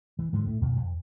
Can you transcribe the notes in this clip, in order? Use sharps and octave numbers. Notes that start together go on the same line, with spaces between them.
E3
G#2 D3 F3 F#3
A2 A3
F2 B2 D#3
F2